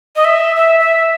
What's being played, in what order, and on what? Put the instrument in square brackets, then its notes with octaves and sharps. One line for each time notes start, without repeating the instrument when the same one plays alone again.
[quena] D#5
E5
E5
E5